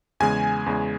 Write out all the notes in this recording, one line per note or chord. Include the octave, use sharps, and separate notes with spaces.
E2 C#3 G#3 G#5
E2 C#3 G#3